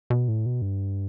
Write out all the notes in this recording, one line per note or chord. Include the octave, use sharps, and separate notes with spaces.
B2
A2
B2
G2